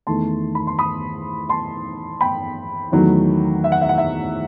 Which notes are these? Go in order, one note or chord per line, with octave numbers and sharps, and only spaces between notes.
E2 D#3 A3 A5 C6
B5
C6
B5 D#6
A5 C6
G5 B5
E2 D#3 F#3 A3
E5
F#5
E5
F#5
E5